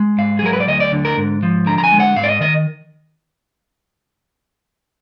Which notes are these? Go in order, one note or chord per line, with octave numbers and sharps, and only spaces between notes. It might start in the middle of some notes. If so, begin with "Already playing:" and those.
Already playing: G#3
G#2 F5
G#4
F#3 A#4
B4
D5
D2 D#5
D5
D3
A#4
G#2
F3
D3 A#5
A#5
G#5
G#3
F#5
G#2 F5
D5
D#5
D#3 D#5